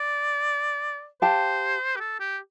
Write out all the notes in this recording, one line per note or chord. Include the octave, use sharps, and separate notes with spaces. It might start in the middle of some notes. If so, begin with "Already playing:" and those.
Already playing: D5
G4 C5 F5 A5
G4
A4
G4